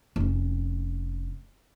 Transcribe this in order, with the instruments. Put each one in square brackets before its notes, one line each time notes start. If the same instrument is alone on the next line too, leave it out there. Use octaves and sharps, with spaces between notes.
[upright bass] F1 C#4